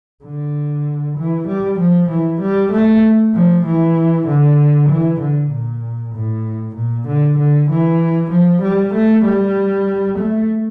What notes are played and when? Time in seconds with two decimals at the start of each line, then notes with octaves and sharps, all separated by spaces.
0.24 D3
1.17 E3
1.48 G3
1.79 F3
2.11 E3
2.41 G3
2.72 A3
3.35 F3
3.66 E3
4.27 D3
4.89 E3
5.21 D3
5.52 A#2
6.15 A2
6.76 A#2
7.08 D3
7.38 D3
7.70 E3
8.32 F3
8.62 G3
8.94 A3
9.25 G3
10.19 A3